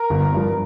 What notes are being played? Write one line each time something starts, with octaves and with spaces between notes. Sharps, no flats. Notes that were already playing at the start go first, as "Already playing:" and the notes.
Already playing: A#4
G1
G2 F3